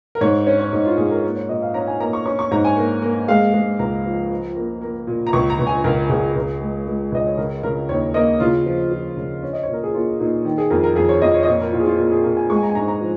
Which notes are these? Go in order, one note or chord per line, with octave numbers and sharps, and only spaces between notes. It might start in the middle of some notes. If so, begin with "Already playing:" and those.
A#4
G#2 C#5
C#4 C#5
C#5
G#2 D#4
F4
G#2 G#4
A#4
A#3
C#5
A#2 D#5
F5
C#4 A#5
G#5
A#3 A#5
C#6
C#4 C#6
C#6
G#2 A#5
G#5
A#3
A#3
G#3 F5
G#3
C#2 A#5
F3
F3
A#3
A#3
A#2
A#5
C#2 C#6
A#5
C#2
G#5
C#2 A#4
C#2 G#4
C#2
G#3
G#3
C#2 D#5
C#5
C#3 A#4
C#3 A#4
D#2 C#5
A#3 D#5
C#3 F4
F3
F3
C#3
C#4
D#5
A#2 C#5
A#4
G#4
A#3 F4
A#2 D#4
D#3
G#4
F2 A#4
A#4
F2 G#4
C#5
F2 D#5
C#5
D#5
A#2 C#5
A#4
A#2 F4
G#4
F4
A#2 F4
G#4
A#2 A#4
G#5
G#3 C#6
G#5
A#5
G#5
G#2 A#5
A#5
F3